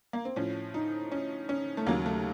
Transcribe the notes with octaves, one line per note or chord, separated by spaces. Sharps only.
A#3
C4
A2 F3 C#4
D#4
C#4
C#4
A3
D#2 C#3 F#3 A#3
A3